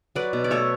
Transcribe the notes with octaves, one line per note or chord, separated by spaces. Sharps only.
F#3 B4 D5
B2
D5
A3 A4 C#5